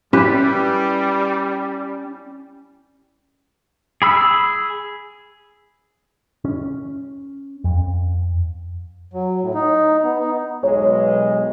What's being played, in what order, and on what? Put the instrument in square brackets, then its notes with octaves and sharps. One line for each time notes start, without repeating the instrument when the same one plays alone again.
[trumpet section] G3 [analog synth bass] C#4 [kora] E4 G4 B4
[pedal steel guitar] G#4 B5 E6
[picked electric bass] C#4
F2
[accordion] F#3
A2
D#4
B3
D#4
[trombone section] B1 G#3 [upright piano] C#5